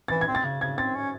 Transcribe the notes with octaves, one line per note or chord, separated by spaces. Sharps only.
E3 A6
G#6
C4
A6
C#3
C#3 G#6
C4 A6
C#4